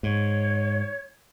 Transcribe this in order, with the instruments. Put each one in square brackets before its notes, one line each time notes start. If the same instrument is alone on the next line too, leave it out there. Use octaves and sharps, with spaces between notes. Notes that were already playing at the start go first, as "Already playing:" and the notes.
[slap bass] G#2 [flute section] C#5